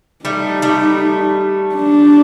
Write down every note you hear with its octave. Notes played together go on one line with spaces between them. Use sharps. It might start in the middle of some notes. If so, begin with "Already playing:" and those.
G3 A3 D#4
G3 A3
D4